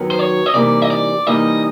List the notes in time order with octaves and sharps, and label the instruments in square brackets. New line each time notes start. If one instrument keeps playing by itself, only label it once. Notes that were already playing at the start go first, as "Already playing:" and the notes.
Already playing: [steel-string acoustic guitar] F#2 D#3 F#3 B3
[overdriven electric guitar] C5
C#5
D#5
[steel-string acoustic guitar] C3 E3 G3 A#3 D#4 [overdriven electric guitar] D5
[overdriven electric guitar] D#5
D5
[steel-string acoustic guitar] C3 E3 G3 A#3 D#4 [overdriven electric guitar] D#5